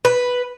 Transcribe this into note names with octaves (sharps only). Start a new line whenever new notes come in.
B4